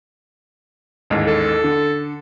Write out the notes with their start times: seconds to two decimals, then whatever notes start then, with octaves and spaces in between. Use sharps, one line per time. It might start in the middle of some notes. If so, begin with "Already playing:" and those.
1.10 A1 D#2 G#2
1.27 A4
1.64 D3